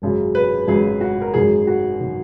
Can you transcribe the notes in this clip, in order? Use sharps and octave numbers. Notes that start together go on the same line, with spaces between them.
G#1 F#2 C#3 F#3
B4
G#1 F#2 C#3 F#3 G#4
F#4
A#4
G#1 F#2 D#3 F#3 G#4
F#4
D#3 F#3